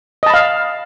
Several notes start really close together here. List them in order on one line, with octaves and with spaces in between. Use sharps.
D#5 A5 B5 F5